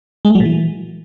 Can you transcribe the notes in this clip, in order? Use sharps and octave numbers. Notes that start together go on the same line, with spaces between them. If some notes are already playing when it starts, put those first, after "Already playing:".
G#3
A3
F#3
A#2
E3